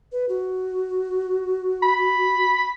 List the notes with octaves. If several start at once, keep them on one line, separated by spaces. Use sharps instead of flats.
B4
F#4
B5